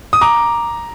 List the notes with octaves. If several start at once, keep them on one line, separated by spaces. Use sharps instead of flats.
D#6
A#5 D6